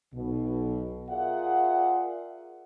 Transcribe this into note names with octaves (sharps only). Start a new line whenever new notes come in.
B1 B2
F4 G#4 A#4 D5 E5 F#5